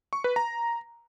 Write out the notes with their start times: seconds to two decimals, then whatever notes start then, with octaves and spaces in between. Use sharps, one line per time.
0.13 C#6
0.24 B4
0.36 A#5